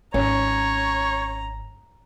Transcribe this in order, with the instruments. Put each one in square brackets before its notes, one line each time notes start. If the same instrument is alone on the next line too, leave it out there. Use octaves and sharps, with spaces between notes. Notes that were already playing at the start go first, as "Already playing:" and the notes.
[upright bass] G#1 [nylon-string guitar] C#4 [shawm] C#5 [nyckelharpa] A#5